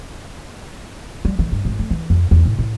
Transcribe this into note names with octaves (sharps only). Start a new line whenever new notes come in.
G3
D#3
G2
G#1
A3
E3
F2
E2
A2
A2